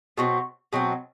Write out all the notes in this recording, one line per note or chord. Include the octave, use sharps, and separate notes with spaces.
B2 F#3 C4
B2 F#3 C4